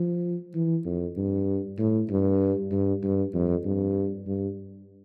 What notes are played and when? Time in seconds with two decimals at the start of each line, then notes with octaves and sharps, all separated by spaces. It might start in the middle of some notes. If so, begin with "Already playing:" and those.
Already playing: F3
0.54 E3
0.85 F2
1.17 G2
1.79 A2
2.10 G2
2.72 G2
3.03 G2
3.34 F2
3.65 G2
4.27 G2